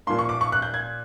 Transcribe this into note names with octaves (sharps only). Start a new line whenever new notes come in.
A#2 F3 A#3 C6
C#6
D6
C#6
F#6
G6
G#6